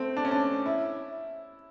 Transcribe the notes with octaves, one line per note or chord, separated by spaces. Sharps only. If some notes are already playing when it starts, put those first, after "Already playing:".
Already playing: A3 C4
D4
C#4
D4
E4